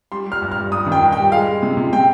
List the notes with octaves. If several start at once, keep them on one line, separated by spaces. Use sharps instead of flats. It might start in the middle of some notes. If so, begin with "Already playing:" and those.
G3 C6
G3
F6
G2
F6
G3
G2 D#6
D#3
G5
G2
G3 G5
G#3 F5
G#3
C3
C3
C3 G5